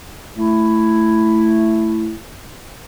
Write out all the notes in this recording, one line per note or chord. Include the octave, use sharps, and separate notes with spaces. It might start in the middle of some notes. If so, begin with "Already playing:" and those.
A3 E4